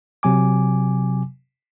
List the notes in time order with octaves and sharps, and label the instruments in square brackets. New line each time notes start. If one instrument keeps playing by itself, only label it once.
[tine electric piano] C3 F#3 G#5 D6